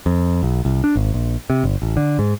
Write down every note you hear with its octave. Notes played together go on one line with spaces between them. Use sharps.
F2
B1
C2
D4
G#1
A#1
C3
G1
A1
D3
G#2